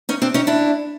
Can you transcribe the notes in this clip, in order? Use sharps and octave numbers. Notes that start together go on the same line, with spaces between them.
C#4 D#4
C4 D4
C#4 D#4
D4 E4